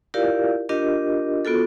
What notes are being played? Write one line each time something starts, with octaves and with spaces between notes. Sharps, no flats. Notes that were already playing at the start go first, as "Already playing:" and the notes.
E4 F4 G4 A#4 D5 F5
D4 F4 G4 A#4 D#5
B3 F4 F#4 A4